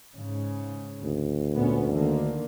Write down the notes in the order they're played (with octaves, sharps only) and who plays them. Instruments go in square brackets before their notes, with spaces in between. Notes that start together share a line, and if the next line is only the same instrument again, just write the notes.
[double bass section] G#2 C#3
[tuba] D2
[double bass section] A#2 B3 C#4
D3 D#3 A#3